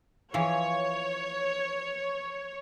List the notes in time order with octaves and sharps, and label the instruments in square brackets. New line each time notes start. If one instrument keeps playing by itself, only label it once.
[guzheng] E3 F3 [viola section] C#5